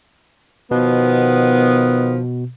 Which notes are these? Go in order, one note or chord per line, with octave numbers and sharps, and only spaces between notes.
B2 D#3 F3 B3